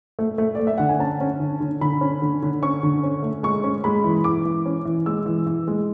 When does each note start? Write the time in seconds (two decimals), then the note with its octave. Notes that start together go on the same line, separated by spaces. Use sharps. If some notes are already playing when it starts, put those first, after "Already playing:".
0.19 A3
0.38 A3
0.55 A3 D5
0.67 E5
0.78 D3 F#5
0.89 G#5
0.99 C#4 A5
1.21 C#4
1.40 D3
1.61 D3
1.81 D3 B5
2.01 C#4
2.22 D3
2.43 D3
2.63 C#4 C#6
2.83 D3
3.03 C#4
3.23 A3
3.43 G#3 C#6
3.64 C#4
3.84 G#3 B5
4.04 E3
4.24 E3 D6
4.45 E3
4.66 C#4
4.85 E3
5.06 G#3 E6
5.26 E3
5.47 E3
5.68 G#3